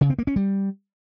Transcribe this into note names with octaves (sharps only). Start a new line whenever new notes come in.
C#3
C4
A#3
C#4
G3